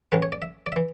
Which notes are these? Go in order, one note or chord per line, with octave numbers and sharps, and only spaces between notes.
A1 A2 E3 B4
C#5
D5
E5
D5
E3 E5